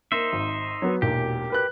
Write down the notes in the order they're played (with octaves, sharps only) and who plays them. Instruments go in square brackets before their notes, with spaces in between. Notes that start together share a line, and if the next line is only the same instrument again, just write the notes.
[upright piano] A#3 [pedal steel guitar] D#4 C5 E5
[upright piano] G#1
F#3 B3
[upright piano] E1 B1 A#2 [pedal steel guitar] G4
[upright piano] A#4 B4 F#6